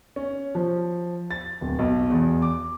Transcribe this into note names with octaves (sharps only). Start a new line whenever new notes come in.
C#4
F3
A6
D1
B1
E2
D6